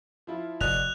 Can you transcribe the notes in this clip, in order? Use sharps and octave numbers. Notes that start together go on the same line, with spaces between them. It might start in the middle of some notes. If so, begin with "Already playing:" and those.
F3 E4 F4
F1 F#4 D5 D#5 F#6 F7